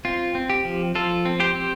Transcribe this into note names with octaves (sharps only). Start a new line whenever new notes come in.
C4 F4
C4
G4
F3
F3 F4 A4
C4
G4 C5
C4